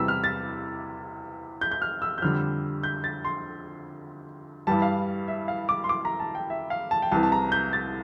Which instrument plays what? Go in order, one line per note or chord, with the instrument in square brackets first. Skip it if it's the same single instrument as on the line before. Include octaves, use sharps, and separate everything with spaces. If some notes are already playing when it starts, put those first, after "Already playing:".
Already playing: [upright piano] E2 C3 E3 G3 E6
F6
A6
G6
G6
F6
E6
G6
F2 D3 G3 F6
G6
A6
C6
G2 E3 G3 A5
F5
E5
F5
D6
C6
D6
A#5
A5
G5
E5
F5
A5
G5
C2 C3 E3 A5
A5
A#5
G6
A6